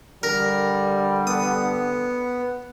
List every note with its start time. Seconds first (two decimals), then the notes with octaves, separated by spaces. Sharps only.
0.23 D3 G3 A#4
1.27 B3 D#6